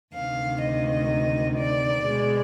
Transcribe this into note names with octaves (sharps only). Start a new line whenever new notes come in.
D2 C3 D#3 F5
D#5
D5
B2 G#3